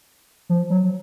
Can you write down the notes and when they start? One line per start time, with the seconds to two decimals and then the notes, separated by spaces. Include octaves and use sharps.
0.49 F3
0.70 F#3